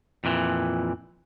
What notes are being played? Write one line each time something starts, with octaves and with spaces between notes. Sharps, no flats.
F2 A#2 E3